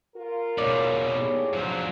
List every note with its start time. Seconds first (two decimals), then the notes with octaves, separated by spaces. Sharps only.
0.16 F4 A#4
0.58 G#2 B2 C#5 D5
1.15 D#2 A2 G#4
1.53 G#2 D3 F3 F#3